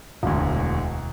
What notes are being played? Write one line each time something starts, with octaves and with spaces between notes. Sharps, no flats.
E1 D2